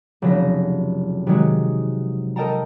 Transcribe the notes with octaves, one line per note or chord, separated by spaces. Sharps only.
F1 C#3 F#3 A#6 B6
C3 D#3 F#3 G#3 F#4
A4 A#4 D#5 G5 A5 A#5